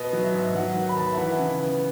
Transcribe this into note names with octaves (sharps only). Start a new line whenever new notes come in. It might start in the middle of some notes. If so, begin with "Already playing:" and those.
Already playing: B2 B3 D#5
F#3
E5
G#2
F#3 F#5
D#3
B5
B3 A5
E5
E3 F#5
C#3
B3